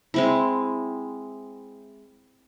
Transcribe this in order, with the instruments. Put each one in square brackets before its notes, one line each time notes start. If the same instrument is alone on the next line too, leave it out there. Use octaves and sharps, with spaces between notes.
[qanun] G#3 C4 E4